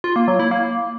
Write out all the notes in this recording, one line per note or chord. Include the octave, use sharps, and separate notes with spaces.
F4
A#3
F#3
E4
A#3